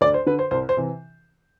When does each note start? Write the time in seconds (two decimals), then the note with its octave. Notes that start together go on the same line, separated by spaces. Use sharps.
0.01 D2 D5
0.14 C5
0.26 D3 B4
0.39 C5
0.51 C2 C5
0.69 C5
0.77 C3 E3